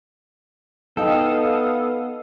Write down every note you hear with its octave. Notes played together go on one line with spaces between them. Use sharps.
B3 D#4 G4 A4 F5 G5 D#6